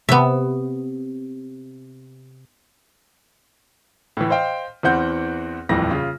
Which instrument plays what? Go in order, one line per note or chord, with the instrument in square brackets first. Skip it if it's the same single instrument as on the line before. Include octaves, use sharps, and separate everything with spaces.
[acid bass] C3 [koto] B3 E5
[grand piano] A2 E3
C5 D#5 F5 G5
E2 E3 C4 F#5 G6
D#1 F2 A2 E3 A#6
C#3 F4